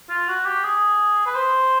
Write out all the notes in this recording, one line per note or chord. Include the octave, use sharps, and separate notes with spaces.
F4
F#4
G4
G#4
B4
C5